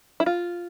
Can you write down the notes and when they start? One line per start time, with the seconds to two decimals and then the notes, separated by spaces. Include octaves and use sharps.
0.20 E4
0.26 F4